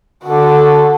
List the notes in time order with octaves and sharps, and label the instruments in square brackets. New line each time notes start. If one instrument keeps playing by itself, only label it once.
[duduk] D3 [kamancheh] F#4 A4